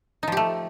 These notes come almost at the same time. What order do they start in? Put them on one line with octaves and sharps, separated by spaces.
D#4 F3 G4 A3